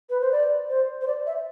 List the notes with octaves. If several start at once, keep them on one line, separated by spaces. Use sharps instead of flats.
B4
C5
D5
C5
C5
D5
E5